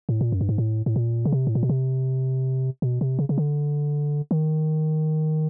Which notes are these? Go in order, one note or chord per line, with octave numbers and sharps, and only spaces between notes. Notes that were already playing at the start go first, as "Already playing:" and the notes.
A2
A#2
F#2
G2
G#2
A2
A2
A#2
C#3
C3
A2
A#2
B2
C3
B2
C3
C#3
C#3
D3
D#3